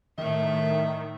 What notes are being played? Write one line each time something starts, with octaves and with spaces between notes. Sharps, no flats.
A2 D#3 A3 E5